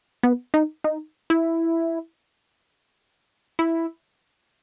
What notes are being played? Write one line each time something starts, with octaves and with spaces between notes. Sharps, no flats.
B3
D#4
D#4
E4
E4